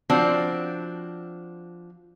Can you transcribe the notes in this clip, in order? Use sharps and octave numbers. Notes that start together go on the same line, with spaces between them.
F3 C4 D4 F#4